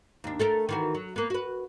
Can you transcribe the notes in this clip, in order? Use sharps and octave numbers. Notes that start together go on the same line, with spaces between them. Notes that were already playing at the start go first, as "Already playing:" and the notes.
D#2 D4
A3 A4 A#4
D#3 E3 F#4
F#3
A#3 B3
F#4 B4